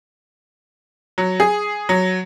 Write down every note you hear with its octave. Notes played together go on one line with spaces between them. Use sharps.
F#3
G#4
F#3